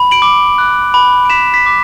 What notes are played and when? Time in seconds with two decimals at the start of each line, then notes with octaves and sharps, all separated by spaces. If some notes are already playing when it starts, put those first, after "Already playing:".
Already playing: B5
0.11 D7 F#7
0.22 D6
0.58 F#6
0.94 B5
1.25 D7
1.30 B5 B6 E7
1.54 B6
1.66 D6